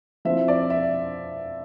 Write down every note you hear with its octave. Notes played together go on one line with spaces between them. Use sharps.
F3 C4 E4 E5
D5
E5